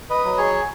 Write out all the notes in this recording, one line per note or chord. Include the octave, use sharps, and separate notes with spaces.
B4 D#5
F#3
G#4 C#5